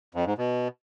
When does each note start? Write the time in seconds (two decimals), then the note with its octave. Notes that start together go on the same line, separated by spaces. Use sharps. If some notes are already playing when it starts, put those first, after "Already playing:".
0.15 F2
0.26 G#2
0.38 B2